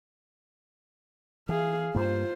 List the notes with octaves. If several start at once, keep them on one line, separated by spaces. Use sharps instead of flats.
E3 G#4 F5
G2 A#3 F4 C5